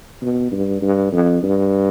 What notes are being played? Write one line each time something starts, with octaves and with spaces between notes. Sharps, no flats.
B2
G2
G2
F2
G2